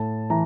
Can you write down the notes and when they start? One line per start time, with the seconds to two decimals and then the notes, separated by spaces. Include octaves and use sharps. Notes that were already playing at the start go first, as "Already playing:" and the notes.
Already playing: A2 A5
0.30 E3 A#5